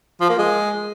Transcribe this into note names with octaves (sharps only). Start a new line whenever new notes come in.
F3
A#3
G#3